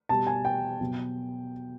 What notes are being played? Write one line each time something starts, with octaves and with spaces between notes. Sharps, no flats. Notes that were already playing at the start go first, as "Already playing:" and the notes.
B2 G3 A5
G#5
G5
B2 F#3